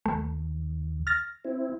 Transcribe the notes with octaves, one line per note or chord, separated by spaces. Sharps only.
D#2 A3
F6 A6 A#6
C4 E4